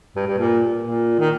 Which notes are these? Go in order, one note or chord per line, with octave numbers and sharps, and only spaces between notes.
G2
G2
A#2
A#2
D#3